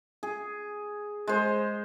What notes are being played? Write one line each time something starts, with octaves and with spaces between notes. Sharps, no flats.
G#4
G#3 C5